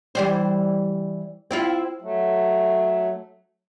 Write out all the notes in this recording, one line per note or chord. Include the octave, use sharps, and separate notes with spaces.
E3 G3 C5
C4 E4 F4
F#3 A3